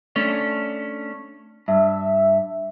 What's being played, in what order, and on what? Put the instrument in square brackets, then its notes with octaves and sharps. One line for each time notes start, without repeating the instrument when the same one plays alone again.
[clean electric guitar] A3 C#4 D4
[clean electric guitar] G2 [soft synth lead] E5